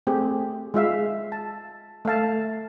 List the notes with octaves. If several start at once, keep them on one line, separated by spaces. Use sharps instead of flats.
A3 C4 G4 G#4
G#3 F4 E5 F5
A5
A3 E5 F5 A5